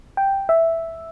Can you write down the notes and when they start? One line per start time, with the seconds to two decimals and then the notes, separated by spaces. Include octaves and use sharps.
0.17 G5
0.49 E5